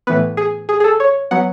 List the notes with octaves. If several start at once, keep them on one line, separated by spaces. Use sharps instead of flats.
A2 E3 B3 B4
G#4
G#4
G#4
A4
C#5
F#3 B3 F#5